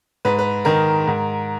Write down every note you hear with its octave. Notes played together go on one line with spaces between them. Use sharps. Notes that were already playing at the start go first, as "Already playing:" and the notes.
G#2 B4
B4
D#3 A#4
G#2